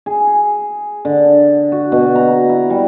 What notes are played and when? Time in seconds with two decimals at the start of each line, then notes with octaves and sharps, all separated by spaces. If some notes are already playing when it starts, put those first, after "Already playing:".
0.06 G#4
1.05 D3
1.72 F#4
1.92 B2
2.15 A#5
2.49 E4
2.70 G3